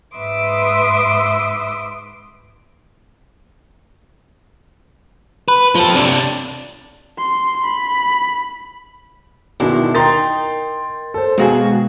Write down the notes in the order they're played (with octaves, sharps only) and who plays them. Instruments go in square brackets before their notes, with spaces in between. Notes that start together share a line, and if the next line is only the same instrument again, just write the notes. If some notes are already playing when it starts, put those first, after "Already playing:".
[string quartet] G#2 B4 E5 C6 D6 D#6
[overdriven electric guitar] B4
F3 A4
C3 D4
[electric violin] C6
B5
[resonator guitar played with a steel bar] E2 G#3 D4 [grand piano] B2 D#3 E4
[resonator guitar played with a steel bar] D#4 [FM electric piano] A#4 [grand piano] G5 C6 A6
[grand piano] A4 C5
[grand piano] B2 [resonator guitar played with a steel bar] D#3 F#4 G#4 [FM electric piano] G#3 F5